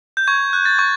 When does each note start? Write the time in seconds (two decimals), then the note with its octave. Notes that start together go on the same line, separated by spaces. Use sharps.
0.17 G6
0.27 C#6 G#6
0.53 F#6
0.65 A6
0.79 C#6